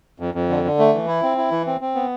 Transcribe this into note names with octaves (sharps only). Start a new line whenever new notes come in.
F2
F2
D3
D3
A3
E3
E4
C4
E4
E3
C4
C4
B3